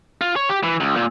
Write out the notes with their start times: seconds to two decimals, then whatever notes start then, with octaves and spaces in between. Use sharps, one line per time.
0.21 F4
0.36 C#5
0.49 G4
0.63 E3
0.80 C#2
0.96 A#2